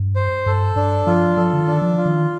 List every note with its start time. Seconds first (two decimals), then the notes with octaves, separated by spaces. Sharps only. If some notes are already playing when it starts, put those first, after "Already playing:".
Already playing: G2
0.16 C5
0.46 G2 A4
0.76 G2 D4
1.07 F3 F4
1.37 F3 A4
1.53 D3
1.59 D#3
1.67 D4
1.82 F3
1.98 F4
2.06 D#3